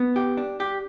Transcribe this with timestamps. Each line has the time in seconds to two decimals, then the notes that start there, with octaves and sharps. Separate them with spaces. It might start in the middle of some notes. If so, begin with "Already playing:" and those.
Already playing: B3
0.16 G4
0.37 D4
0.60 G4